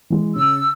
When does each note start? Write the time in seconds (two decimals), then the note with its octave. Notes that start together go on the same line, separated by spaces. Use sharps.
0.10 E3 G#3
0.35 C#3 E6